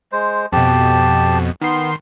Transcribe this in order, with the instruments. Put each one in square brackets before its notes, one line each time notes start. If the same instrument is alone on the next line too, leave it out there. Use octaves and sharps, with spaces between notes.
[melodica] G#3 C5
[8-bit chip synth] F2 B2 [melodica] G4 A5
[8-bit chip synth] D#3 C6 [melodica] B3